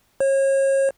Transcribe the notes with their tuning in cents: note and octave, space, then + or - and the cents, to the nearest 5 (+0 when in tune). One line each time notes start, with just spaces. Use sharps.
C#5 -35